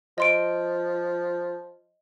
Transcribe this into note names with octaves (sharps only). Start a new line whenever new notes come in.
F3 D#5 C6 D7